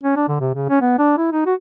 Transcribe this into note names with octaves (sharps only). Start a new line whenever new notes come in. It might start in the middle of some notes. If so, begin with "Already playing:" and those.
C#4
D4
D3
C3
C#3
C#4
B3
D4
E4
D#4
F#4